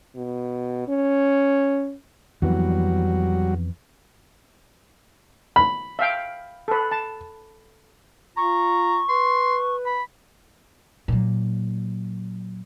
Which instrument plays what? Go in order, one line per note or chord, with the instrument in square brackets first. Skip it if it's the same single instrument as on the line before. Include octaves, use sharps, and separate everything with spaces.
[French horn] B2
C#4
[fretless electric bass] F2 E3 B3 [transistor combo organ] F#3 G3 F#4
[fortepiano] B5
[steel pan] E5 F5 G5
A4 B4
A5
[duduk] F4 [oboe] A#5 [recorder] C#6
[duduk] B4 [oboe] C6
[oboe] B5
[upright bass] A#2 F#3